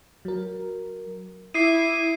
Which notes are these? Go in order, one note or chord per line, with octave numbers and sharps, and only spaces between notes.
F#3 A#4
E4 D6 D#6 C7 D#7